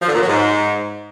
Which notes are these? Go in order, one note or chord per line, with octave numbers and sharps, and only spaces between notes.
F3
D3
A#2
F#3
G#2